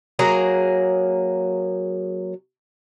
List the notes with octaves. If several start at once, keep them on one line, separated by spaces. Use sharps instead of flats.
F#3 A#3 G#4 A#5